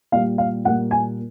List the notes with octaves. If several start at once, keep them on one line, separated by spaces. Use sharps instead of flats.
A#2 G3 A#3 F5
F5
A#2 G3 A#3 F#5
G#5